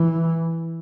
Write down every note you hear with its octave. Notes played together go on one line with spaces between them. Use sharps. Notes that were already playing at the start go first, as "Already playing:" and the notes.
Already playing: E3